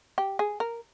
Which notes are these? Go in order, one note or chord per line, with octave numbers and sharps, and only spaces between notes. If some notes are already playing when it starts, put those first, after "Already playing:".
G4
G#4
A#4